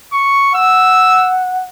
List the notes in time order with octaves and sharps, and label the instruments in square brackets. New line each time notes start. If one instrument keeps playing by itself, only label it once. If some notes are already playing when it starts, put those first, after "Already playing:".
[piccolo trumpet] C#6
[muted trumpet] F#5 [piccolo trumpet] E6